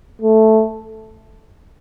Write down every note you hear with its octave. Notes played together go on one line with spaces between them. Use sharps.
A3